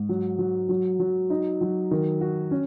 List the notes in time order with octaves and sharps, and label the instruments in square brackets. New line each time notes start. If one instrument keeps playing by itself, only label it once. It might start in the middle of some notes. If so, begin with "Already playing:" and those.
Already playing: [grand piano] G#2
F#3
F#3
F#3
F#3
D#4
F#3
D#3
F#4
C#4